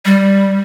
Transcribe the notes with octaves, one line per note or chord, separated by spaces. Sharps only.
G3